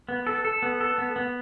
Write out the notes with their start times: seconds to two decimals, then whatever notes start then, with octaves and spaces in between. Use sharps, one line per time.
0.09 B3
0.27 A4
0.45 A4
0.62 B3
0.81 A4
0.98 B3
1.16 B3